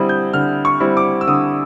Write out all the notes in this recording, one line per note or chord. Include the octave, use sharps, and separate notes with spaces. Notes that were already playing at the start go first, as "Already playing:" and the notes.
Already playing: D3 G3 C4 E4 D#6
G6
D3 F6
C#6
G3 C4 E4
D6
E6
D3 D#6